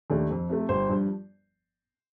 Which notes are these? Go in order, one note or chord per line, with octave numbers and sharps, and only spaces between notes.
D#2 D#3 A3 D4
F2
C3 F3 A3
G1 C5
G2 F3